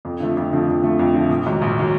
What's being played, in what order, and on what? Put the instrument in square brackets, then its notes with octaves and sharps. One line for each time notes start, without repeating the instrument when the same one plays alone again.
[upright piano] F2
D3 F3 A3
F2
D3 F3 A3
F2
D3 F3 A3
F2
D3 F3 A3
A#1
G#2 D#3 F#3
A#1
D#3 F#3